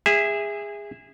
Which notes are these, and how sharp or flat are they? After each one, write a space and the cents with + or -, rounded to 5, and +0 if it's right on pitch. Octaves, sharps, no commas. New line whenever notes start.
G#4 -20 E5 +0